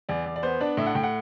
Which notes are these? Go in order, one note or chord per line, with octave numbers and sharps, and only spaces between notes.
E2 D5
E2
D5
B3 C5
D4 D5
A2 E5
F#5
A2 G5
F#5